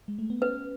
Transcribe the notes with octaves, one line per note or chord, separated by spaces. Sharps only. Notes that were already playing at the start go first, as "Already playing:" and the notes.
G#3
A3
B3
C#4 B4